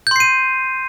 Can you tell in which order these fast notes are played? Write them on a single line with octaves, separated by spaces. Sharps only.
G6 C6 C7 D#7